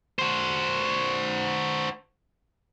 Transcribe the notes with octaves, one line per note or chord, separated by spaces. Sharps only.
F#4 C5